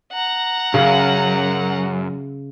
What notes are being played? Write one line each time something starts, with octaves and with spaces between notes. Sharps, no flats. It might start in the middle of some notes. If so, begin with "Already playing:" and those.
F#5 A#5
F#2 C#3